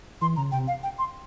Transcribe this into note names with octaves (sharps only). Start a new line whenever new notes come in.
E3 C6
C#3 A#5
C3 G5
F5
G5
C6